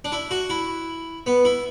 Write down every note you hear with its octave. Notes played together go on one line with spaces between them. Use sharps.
D4
E4
F#4
E4
B3
E4